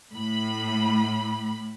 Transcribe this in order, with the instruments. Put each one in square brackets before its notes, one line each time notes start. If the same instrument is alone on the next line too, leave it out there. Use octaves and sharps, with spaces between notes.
[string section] A2 B5